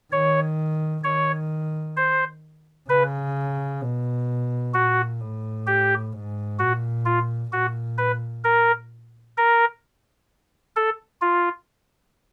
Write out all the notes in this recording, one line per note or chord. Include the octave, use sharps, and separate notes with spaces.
D#3 C#5
D#3 C#5
C5
C#3 B4
B2
A#2 F#4
A2
G4
G#2
A#2 F#4
F4
A#2 F#4
B4
A#4
A#4
A4
F4